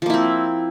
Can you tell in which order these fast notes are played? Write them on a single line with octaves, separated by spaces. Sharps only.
F3 A#3 E4 C4